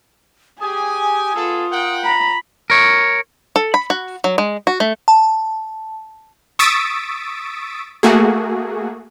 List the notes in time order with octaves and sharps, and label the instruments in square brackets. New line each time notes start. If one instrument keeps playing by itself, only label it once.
[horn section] G4 G#5 [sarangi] G#4 [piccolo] D#6
[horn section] B3 G#4 A4 [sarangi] F4
[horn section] A#4 F#5 G5
[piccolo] A#5 [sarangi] B5
[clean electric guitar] A#4 C#5
[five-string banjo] A4
B5
F#4
F#3
G#3
F#4
A3
[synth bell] A5
[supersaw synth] C#6 D#6 E6 A6 B6 D7
A3 A#3 F#4 G#4